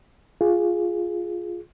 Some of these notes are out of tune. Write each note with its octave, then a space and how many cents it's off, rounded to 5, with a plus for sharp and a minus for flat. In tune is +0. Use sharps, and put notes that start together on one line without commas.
F4 +0 G#4 +0